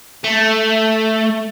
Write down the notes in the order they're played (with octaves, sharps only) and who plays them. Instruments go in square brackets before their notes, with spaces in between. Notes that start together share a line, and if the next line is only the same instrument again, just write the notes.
[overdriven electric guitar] A3